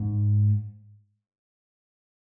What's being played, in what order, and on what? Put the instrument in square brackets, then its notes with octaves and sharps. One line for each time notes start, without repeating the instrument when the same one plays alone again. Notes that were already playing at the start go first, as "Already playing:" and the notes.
Already playing: [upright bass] G#2